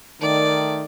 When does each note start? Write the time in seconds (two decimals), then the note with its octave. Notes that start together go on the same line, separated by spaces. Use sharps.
0.21 D#3 A3 D5